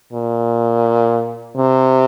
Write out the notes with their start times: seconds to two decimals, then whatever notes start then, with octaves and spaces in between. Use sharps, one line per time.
0.13 A#2
1.57 C3